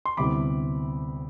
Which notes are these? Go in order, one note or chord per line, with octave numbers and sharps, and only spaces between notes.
C6
D2 C3 G3 B3 E4 B5 D6